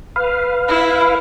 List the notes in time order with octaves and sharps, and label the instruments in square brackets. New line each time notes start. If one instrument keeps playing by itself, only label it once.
[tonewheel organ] B4 F5
[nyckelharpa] E4